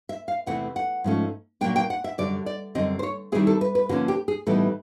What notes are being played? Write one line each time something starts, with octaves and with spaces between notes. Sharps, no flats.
E5
F5
E2 C3 E3 A3 C4 F#5
F#5
G#2 F3 A3 C#4
A#2 F#3 A#3 D4 G5
G5
F#5
E5
F#2 D3 G3 D5
D5
F#2 D3 G3 C4 D#5
C5
C#5
D#3 G3 C4 E4 G#4
A4
B4
B4
D3 F3 A#3 C#4 F#4
G4
G#4
A2 E3 G3 B3 D#4 A4